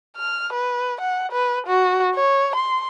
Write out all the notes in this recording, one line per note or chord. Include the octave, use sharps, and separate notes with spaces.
F6
B4
F#5
B4
F#4
C#5
C6